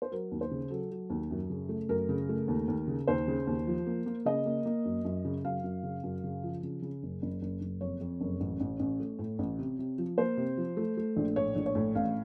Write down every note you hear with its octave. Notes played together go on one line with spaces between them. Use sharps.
C5
F#3 A#4
D#2
C5
C#3
F#3 A4
F#3
D#2
F#2
C#3
A3
F#2 A#4
C#3
A3
D#2
D#2
C#3
D#2 C5
C#3
D#2
F3
A#3
A#3
C#3 D#5
A#3
A#3
F#2
F#2
C#3
F#2 F5
F#2
C#3
F#2
C#3
F3
C#3
C#3
F#1
F#1
F#1
F#1
F2 C#5
F2
F#1
A1
A1
A1
A3
A2
A1
C3
C3
F3
A#3 C5
C3
F3
A3
A3
A#1
A2 C#5
A#1
C#5
A2
A1 F5